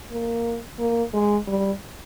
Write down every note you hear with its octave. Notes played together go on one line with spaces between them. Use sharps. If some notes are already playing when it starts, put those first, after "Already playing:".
A#3
A#3
G#3
G3